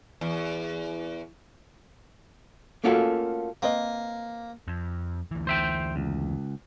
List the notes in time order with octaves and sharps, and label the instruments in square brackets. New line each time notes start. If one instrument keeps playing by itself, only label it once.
[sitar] E2
[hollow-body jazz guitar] A3 A#3 C#4 F4 F#4 A4
[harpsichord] A#3 [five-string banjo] C4 B4 D#5
[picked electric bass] F2
D2 E3
[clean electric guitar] C5 E5 G5
C#2